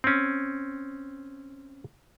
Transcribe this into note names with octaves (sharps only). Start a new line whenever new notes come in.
C4 C#4